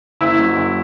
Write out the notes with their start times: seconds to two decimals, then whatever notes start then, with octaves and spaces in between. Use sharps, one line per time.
0.21 F#1 E4
0.39 F#3
0.57 F#1